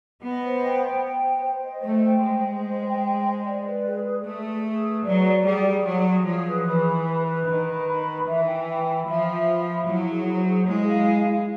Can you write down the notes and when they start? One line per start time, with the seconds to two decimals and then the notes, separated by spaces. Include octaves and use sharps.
0.23 B3 D#5
0.44 C5
0.63 G5
0.84 G5
1.03 G5
1.23 C5
1.44 C5
1.63 D#5
1.84 A3 C5
2.04 G5
2.23 G#3 C5
2.44 C5
2.64 D#5
2.84 G5
3.04 C5
3.25 C5
3.45 D5
3.64 B4
3.85 G#4
4.05 G#4
4.25 A3 G#4
4.46 G#4
4.65 G#4
4.86 B4
5.06 F#3 D5
5.26 D5
5.45 G3 G#4
5.66 G#4
5.86 F#3 G#4
6.06 G#4
6.25 F3 G#4
6.45 B4
6.66 E3 B5
6.86 B5
7.06 B4
7.27 B4
7.46 D#3 B5
7.67 B4
7.87 B5
8.07 B4
8.27 E3 E5
8.47 G5
8.68 G5
8.87 B5
9.07 F3 E5
9.27 E5
9.48 B5
9.67 E5
9.88 F#3 E4
10.08 G#4
10.28 C5
10.48 G#4
10.68 G#3 E4
10.88 F5
11.08 E4
11.29 E4